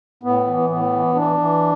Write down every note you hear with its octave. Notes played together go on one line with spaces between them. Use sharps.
A2 B3
E3
A2 B3
E3
E3 D4
E3